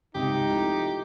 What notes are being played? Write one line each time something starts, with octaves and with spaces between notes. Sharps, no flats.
C#2 G#2 C3 D#4 G4
F3 A3 E4